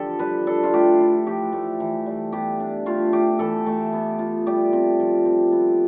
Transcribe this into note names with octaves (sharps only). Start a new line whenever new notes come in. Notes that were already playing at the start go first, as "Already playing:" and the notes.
Already playing: D3 F3 G4 A4
G3 B4
D4 A4
F4
A3 G4
E4
F3 G4
A3
E3
G3
B3 G4
D4
A3 F4
E4 G4
E3 A4
A3
B3
F4
G3 G4
C4
F3
C4
B3